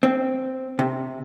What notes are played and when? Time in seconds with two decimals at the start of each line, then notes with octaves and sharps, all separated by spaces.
0.03 C4
0.79 C3